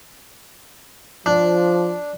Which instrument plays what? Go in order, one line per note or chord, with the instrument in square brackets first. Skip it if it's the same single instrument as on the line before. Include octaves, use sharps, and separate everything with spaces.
[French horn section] F3 [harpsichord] D4